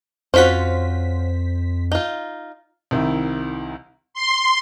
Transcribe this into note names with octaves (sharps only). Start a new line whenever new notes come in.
F2 C#4 F4 F#4 C5 B6
D#4 F4
C2 D#3 E4
C6